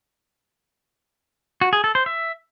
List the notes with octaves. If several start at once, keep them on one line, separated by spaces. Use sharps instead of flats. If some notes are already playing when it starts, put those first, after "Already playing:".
F#4
G#4
A4
C5
E5